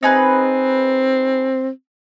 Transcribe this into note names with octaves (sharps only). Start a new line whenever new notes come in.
C4 D#4 G#4 B4